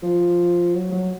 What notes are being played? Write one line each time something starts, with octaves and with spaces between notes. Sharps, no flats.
F3
F#3
F#3